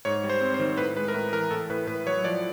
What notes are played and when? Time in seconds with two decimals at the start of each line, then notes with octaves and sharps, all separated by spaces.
0.05 G#2 C#5
0.24 G3
0.29 C5
0.41 C4
0.54 C5
0.59 D#3
0.77 A2 B4
0.96 G#3 B4
1.08 A#4
1.14 A2 B4
1.32 E3 A#4
1.51 A2 A4
1.70 A2 B4
1.87 A2 B4
2.07 F#3 C#5
2.24 F3 D5